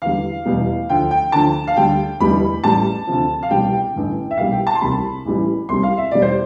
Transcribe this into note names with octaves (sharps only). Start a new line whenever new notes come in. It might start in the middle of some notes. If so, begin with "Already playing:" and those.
E2 D3 G3 F5
F1 E2 B2 G3
D2 D3 F3 G5
G5
D2 D3 F3 A5
F5
D2 D3 G3 G5
F1 E2 D3 G3 B5
A1 A2 G3 A5
D2 C3 F3
F5
C2 B2 G3 G5
G5
A1 G2 D3
E5
C2 B2 G3 F5
G5
A5
C6
C2 C3 G3 B5
A1 A2 E3 G3
C2 C3 G3 C6
F5
E5
E2 B2 G3 D5
C5